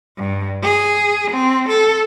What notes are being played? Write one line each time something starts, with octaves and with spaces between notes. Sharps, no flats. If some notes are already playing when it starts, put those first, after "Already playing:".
G2
G#4
C4
A4